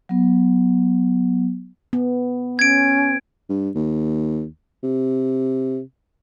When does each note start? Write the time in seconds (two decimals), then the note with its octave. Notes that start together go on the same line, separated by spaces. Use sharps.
0.09 F#3 B3
1.93 B3
2.59 C#4 G#6 D7
3.49 G2
3.75 D#2
4.83 C3